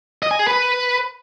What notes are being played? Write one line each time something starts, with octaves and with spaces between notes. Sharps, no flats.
D#5
G#5
G#4
B4